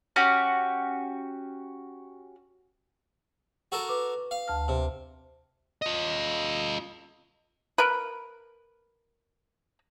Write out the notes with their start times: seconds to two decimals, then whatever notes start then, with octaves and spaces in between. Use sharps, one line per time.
0.16 C#4 F#4 G4
3.72 F#4 A4 A#4
3.89 B4 D6
4.31 F5
4.48 D2 A5 F6
4.68 C3
5.82 F4 D#5
7.78 A#4 B4